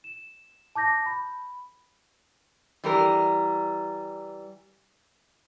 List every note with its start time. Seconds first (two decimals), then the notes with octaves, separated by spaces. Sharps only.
0.04 E7
0.75 A5 D6 G6 A#6
1.06 B5
2.84 E3 G3 A#4